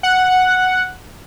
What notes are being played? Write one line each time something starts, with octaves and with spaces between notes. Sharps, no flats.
F#5